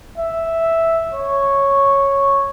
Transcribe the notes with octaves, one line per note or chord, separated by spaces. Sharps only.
E5
C#5